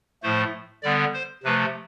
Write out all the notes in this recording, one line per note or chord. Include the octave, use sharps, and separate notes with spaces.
A2 F3 A3 C5
D3 G3 B3 D5
C5
C3 F3 A3 B4